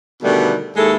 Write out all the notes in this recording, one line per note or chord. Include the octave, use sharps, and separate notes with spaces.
B2 D3 D#3 G3 A3 B3
D#2 G#3 E4 A4